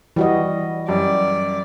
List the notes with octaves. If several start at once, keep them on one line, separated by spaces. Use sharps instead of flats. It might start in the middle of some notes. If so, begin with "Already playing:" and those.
E3 G3 F#4 D#5
F#2 G3 D5